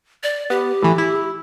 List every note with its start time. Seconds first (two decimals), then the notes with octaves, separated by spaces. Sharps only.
0.23 D5
0.50 B3 G4
0.82 A2 E3
0.98 E4